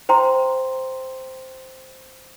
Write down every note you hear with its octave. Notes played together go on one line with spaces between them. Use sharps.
C5 G5 A#5 C6